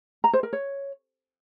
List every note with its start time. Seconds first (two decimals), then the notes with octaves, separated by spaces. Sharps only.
0.24 A#5
0.33 C5
0.43 A#4
0.53 C#5